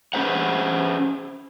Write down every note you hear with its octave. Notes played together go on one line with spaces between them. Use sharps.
C#4 G#4 C5 F#5